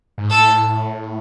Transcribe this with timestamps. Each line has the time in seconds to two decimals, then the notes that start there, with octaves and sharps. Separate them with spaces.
0.18 G#2
0.30 A2 A4